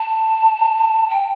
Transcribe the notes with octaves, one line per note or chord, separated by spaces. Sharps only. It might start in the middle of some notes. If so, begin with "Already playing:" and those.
Already playing: A5
G5